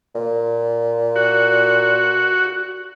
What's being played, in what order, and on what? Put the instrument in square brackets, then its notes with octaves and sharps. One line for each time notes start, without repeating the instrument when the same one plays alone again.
[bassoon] A#2
[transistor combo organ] F#4